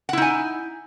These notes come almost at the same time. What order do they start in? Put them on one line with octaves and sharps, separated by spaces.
F#5 E4 D#4 G#5